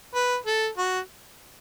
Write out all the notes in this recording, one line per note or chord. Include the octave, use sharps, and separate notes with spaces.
B4
A4
F#4